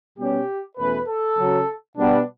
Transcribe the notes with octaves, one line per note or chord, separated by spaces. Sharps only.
B2 G3 C#4 G4
E2 B2 A3 C#4 B4
A4
C#3 F#3 C#4
B2 G3 B3 D4